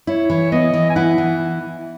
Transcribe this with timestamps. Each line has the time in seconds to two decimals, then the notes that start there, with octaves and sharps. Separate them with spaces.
0.07 E4 C#5
0.30 E3
0.52 B3 D#5
0.74 E3
0.90 G#5
0.96 E4 F#5
1.18 E3